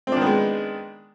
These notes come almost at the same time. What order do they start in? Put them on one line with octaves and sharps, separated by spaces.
C4 D4 D#3 B3 G#3